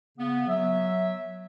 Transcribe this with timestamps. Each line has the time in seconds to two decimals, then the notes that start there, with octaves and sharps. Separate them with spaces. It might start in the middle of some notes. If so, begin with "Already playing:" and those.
0.18 C#3 B3
0.48 F#3 E5